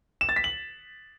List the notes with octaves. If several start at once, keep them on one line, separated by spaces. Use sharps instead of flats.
E7
A6
B6
F#7